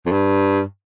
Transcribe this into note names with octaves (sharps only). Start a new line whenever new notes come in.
F2
G2